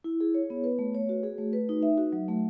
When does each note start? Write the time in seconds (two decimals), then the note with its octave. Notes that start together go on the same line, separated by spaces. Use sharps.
0.04 E4
0.20 G#4
0.34 C#5
0.50 B3
0.64 B4
0.79 A3
0.95 C#5
1.09 F#4
1.23 G#4
1.38 A3
1.53 B4
1.69 D#4
1.83 E5
1.98 F#4
2.13 F#3
2.28 A3